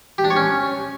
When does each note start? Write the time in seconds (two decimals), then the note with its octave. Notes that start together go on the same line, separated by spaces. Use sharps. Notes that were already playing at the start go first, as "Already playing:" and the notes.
0.18 G4
0.24 D4
0.30 C#5
0.36 C#4